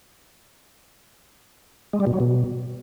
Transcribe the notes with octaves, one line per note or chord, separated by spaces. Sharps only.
G#3
G3
B2
F#3
B2